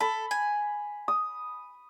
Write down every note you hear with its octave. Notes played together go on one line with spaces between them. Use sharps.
A4 B5
G#5
D#6